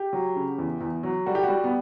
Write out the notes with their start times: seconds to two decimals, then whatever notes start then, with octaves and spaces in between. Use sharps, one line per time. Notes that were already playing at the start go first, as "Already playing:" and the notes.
Already playing: G4
0.13 F#3
0.36 C#3
0.58 E2
0.81 E2
1.03 F#3
1.26 G3 F#4
1.35 G4
1.43 F#4
1.49 G3
1.64 B3